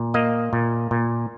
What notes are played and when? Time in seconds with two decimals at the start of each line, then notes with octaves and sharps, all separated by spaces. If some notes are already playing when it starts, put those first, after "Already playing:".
Already playing: A#2
0.14 A#3 D#5
0.53 A#2
0.91 A#2